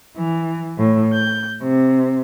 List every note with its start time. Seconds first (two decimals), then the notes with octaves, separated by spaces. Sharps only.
0.17 E3
0.78 A2
1.14 G6
1.62 C3